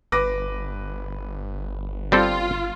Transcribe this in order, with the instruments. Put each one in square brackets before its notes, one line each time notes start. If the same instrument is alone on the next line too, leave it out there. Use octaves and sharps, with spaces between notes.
[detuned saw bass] G1 [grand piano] B4 D6 A#6
[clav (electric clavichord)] G3 C4 A4 [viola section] F4